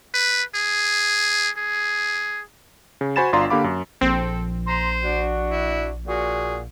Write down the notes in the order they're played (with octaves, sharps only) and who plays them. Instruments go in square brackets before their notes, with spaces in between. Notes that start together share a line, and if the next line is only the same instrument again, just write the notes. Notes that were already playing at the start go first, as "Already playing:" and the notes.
[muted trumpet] B4
G#4
G#4
[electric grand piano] C#3
F#4 C5 G#5 B5 A6 E7
G1 D4 F4 D5 A#5 C6
D3 A#3 G4 F5 B5 D6
F#2
[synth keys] A#1 [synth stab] C4 [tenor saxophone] A4
[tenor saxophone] C5 [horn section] A#5 C6
[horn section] D4 F#4
[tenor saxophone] E4
[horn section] A#2 F#4 [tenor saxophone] G#4